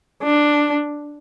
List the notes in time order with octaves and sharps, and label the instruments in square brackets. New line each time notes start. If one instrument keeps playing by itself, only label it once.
[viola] D4